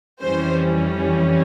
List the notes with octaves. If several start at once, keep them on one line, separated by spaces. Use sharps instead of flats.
F2 E3 G3 C#4 C5